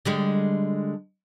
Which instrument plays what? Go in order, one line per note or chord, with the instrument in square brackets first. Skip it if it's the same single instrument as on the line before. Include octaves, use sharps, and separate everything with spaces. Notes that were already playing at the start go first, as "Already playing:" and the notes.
[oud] D3 G3 G#3